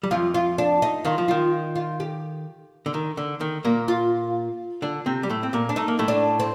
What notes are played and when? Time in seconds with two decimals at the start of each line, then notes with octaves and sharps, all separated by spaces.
0.03 G3
0.11 F2 F3 F4
0.34 F4
0.58 D4
0.82 D#4
1.05 D#3 F4
1.18 F3
1.28 D#3 F4
1.76 F4
2.00 G4
2.86 D3
2.94 D#3
3.17 D3
3.41 D#3
3.64 A#2 A#3
3.88 F4
4.82 D3 D4
5.06 C3 C4
5.23 G3
5.29 A2 A3
5.43 C4
5.53 A#2 A#3
5.69 D4
5.76 A3 D#4
5.88 A#3
5.99 A2 A3
6.08 D4
6.40 C4